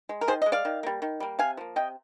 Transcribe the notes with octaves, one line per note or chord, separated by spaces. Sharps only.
G#3
A#4
D#3 G#4 C5
G#3 D#5
D5 F5
D#3
G3 A#3
D#3
G3 A#3
C3 F5 G#5
F3 A#3
C3 D#5 G5